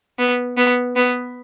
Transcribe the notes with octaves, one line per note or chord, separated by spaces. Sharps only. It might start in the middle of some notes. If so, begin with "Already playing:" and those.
B3
B3
B3